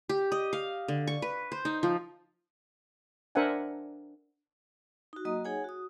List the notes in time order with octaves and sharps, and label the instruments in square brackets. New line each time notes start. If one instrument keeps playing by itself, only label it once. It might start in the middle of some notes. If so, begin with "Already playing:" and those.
[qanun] G4
D#5
F5
D3
C#6
B4
C5
D#4
F3
[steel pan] D4 A#4 C5 E5 F#5 G#5
[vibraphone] D#4 F#4
F#3 A#3 F#4 D#5 A#5 D#6
D#4 G#4 C#5 F#5 G#5
F#4 D#6